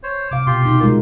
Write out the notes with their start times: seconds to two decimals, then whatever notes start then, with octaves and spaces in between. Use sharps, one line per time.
0.03 C5 C#5
0.31 C3 F5 D6
0.47 B2 F4 G4 C6
0.63 B2 D3 D#4
0.81 G#3 F4 A#4